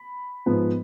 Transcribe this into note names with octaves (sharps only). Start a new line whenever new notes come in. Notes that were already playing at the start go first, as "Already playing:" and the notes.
Already playing: B5
G#2 F3 B3